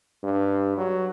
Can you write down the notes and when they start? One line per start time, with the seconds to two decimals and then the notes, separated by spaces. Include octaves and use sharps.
0.23 G2
0.78 F#3